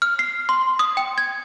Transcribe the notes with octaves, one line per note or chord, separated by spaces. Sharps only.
F6
C7
C6
D#6
G5
G#6